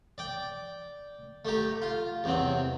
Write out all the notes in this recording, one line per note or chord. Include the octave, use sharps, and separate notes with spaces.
D5 G5
A3 G4 A#5
F4
E2 C3 F#3 C4